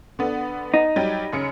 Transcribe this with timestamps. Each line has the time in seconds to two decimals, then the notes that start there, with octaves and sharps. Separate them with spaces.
0.19 D3 B3
0.74 D#4
0.96 F#3 G3 G4
1.33 F#2 C#3 C#7